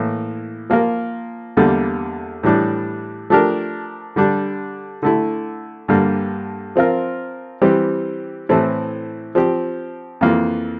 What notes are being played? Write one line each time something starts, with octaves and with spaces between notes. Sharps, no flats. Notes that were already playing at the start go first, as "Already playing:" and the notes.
Already playing: A2 E3 A#3
F3 A#3 F4 A#4
E2 D3 G3 A#3
A2 E3 G3 D4
F3 A3 D4 G4 A#4
D3 G3 D4
D3 A3 E4
G2 D3 G3 A#3
F3 C4 F4 A#4
E3 G3 C4 G4
A2 E3 A3 C4 E4
F3 C4 G4
F2 E3 A#3 F4